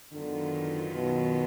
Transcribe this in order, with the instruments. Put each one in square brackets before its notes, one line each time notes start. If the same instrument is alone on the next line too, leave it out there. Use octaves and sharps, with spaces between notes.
[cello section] F#2 D#3 F#3 B3 F4 [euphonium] D3
[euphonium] B2